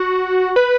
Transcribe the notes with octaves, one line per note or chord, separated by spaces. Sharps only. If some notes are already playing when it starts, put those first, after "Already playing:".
Already playing: F#4
B4